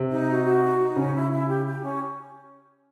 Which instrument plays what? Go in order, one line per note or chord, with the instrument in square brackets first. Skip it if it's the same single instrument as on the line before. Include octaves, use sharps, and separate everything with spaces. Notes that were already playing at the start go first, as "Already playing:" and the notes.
Already playing: [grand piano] C3
[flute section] D#4
F#4
F#4
D#4
D#4
[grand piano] C#3 [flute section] C#4
[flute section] E4
E4
G4
G4
C#4